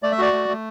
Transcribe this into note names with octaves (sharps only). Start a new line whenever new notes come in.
A3 D5
E5
F#4 D5
A3
A3